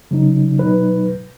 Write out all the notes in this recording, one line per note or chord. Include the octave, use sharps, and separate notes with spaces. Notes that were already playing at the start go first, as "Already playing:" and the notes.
C#3 F#3 D#4
B2 F#3 D#4 B4